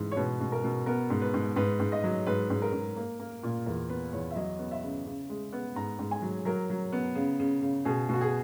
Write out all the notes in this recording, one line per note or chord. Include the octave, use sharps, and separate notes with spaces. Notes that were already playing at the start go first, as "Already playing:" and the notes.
Already playing: G#2 E3
C#5
B2 B4
B2
A#4
B2
B3 A#4
G#2
B4
G#2
G#2 B4
G#2
D#5
F#3
G#2 B4
G#2
A#4
G#2
A#3
A#3
A#2
E2 A#4
B3 B4
E2 C#5
E5
F#3 D#5
B3
E5
C#3
C#3
G#3
B3
G#2 A#5
G#2
G#5
F#3
F#3 A#4
F#3
B3
C#3
C#3
C#3
B2 G#4
B2 F#4
G#4